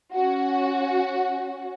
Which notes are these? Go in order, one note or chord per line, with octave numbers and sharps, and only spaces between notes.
C#4 F#4